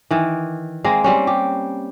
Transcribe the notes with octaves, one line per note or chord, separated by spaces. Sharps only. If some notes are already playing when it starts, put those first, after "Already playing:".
D#3 E3
G#3 A#3 C4
G3 C4 C#4
G4